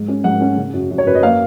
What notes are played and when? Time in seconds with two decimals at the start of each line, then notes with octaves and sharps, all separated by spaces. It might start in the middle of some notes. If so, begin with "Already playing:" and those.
Already playing: G#2
0.08 C#4
0.24 G#2 F#5
0.41 C#4
0.57 C#3
0.74 F#2
0.91 F#2
0.98 C#5
1.07 F#2 B4
1.15 D#5
1.23 A#3 F5